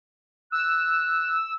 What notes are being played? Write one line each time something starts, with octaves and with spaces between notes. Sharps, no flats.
E6 F#6